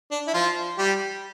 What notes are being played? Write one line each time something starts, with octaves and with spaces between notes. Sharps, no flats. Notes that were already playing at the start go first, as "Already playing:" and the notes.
D4
E4
F3 F4
G3 G4